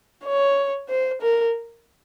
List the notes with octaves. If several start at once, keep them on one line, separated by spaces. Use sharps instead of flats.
C#5
C5
A#4